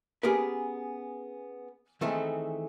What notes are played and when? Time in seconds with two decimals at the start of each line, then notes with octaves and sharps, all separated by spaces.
0.23 B3 C#4 G4 G#4 A#4 B4
2.01 D#3 E3 A3 C4 G#4 A4